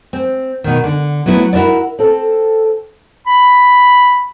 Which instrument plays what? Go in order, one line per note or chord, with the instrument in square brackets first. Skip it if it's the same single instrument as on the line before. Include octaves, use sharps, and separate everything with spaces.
[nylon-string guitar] C4
B2 D#3
D3
F#3 A3 B3 E4
E4 F#4 A#4 D5
[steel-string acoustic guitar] C4 A4
[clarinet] B5